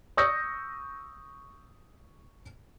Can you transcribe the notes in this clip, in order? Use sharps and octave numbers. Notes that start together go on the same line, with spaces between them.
C#6 D#6 E6 G6 A#6 C#7